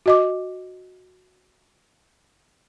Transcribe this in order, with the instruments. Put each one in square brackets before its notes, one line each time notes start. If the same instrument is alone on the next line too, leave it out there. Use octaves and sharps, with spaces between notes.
[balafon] F#4 D#5 D6